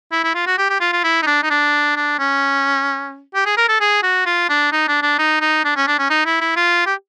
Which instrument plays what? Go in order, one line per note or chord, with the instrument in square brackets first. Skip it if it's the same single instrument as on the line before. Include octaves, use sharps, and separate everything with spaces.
[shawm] E4
E4
F4
F#4
G4
G4
F4
F4
E4
D#4
D4
D#4
D4
D4
C#4
G4
G#4
A#4
A4
G#4
F#4
F4
D4
D#4
D4
D4
D#4
D#4
D4
C#4
D4
C#4
D#4
E4
E4
F4
G4